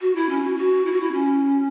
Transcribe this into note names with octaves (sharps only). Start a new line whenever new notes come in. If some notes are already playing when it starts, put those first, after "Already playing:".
F#4
E4
C#4
F#4
F#4
E4
F#4
E4
C#4